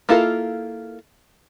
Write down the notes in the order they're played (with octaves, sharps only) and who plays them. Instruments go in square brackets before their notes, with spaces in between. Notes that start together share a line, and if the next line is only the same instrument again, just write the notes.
[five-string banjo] A#3 E4 F4 A4 A#4